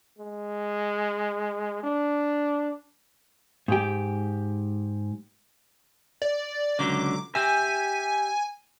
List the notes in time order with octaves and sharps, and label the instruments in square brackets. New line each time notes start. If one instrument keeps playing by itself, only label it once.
[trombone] G#3
D4
[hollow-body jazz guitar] G#2 G4
[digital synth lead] D5
[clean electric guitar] C#2 D3 F#3 [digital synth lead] D6
[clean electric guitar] G4 E5 [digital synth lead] G#5